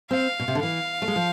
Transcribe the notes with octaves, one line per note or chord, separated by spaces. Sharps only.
C4 F5
B2
C3
D3
E3 F5
A3
G#3
F3